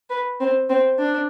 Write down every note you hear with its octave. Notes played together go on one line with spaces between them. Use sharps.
B4
C4
C4
D4